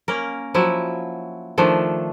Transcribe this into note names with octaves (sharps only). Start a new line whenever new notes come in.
A#3 C#4 A#4
F3 F#3 E4 E5
D#3 F3 A3 D4